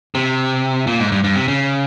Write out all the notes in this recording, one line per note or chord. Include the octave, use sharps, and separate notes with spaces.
C3
A#2
G#2
G2
G2
C3
C#3